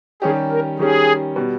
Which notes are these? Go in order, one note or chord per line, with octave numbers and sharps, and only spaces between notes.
D#3 G3 C#4 G4 G#4
A#4
D#3 G3 C#4 G4 G#4
B2 G3